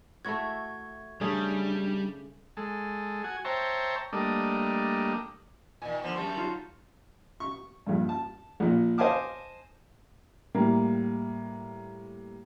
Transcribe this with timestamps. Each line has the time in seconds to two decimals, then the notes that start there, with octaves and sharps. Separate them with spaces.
0.25 A3 E4 F#4 C#6 G#6
1.21 C#3 G3 A3 D4 G#4
2.57 G#3 A4
3.24 F#4 G#5
3.45 C5 C#5 E5 G5 A5 A#5
4.13 G3 A3 A#3 D4 D#5
5.82 A#2 D#3 G#5
6.02 D3 F3 B3
6.16 F#2 G3 A5 C#6 G6
6.36 F#3 D#4 F4
7.40 C#6
7.87 A#1 G2
8.09 A5
8.60 A#1 A#2
8.98 C5 D#5 F5 G#5 A5 D6
10.55 A2 G3 A#3